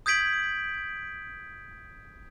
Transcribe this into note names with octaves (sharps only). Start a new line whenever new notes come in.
D#6 G6 G#6 B6 D7 F#7